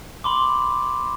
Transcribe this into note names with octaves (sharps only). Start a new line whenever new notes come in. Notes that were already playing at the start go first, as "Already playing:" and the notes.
B5 C6 D6